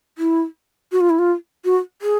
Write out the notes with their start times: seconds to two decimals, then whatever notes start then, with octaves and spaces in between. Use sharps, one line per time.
0.18 E4
0.92 F#4
1.01 F4
1.10 E4
1.19 F4
1.65 F#4
2.02 G#4